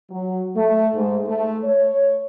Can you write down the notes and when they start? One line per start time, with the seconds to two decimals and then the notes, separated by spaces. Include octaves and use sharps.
0.10 F#3
0.55 A3
0.95 G#2
1.27 A3
1.63 C#5